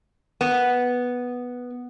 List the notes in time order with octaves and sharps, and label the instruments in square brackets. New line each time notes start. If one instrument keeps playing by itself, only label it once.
[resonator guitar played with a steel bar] B3